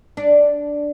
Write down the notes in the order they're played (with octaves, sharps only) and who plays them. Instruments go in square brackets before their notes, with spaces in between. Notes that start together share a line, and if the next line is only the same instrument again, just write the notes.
[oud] D4